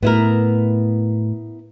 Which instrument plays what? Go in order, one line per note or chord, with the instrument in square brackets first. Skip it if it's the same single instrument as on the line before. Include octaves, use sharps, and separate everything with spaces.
[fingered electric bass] A2 [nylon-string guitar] B3 E4 A#4